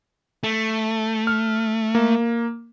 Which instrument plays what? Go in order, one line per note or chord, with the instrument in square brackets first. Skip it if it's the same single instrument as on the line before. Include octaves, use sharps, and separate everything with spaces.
[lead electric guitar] A3
[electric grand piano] F6
A#3